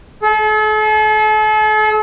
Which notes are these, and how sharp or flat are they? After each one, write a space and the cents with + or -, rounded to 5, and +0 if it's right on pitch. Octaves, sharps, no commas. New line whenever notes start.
A4 -40